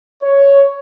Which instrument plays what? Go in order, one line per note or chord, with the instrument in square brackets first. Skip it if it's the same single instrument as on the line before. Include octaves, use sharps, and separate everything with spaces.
[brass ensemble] C#5